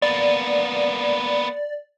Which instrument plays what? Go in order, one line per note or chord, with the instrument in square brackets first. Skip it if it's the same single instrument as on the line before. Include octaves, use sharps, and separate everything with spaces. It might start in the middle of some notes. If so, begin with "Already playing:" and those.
[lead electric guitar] A#3 B3 [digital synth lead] D5